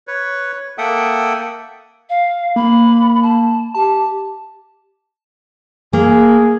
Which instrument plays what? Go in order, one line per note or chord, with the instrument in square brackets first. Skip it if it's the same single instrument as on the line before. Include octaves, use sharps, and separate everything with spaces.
[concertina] B4 C#5
A#3 A4 E5 F#5 G5 D#6
[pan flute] F5
[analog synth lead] A#3 [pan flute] B5
[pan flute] A5
[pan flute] G4 [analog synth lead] A5
[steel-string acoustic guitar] A#3 [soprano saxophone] G#4